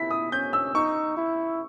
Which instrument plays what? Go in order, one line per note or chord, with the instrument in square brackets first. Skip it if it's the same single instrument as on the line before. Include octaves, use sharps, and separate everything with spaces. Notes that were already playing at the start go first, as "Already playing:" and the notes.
Already playing: [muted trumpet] E4 [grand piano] B6
[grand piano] D#6
[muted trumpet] C#4 [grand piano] G6
[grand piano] E6
[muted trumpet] D#4 [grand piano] C#6
[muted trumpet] E4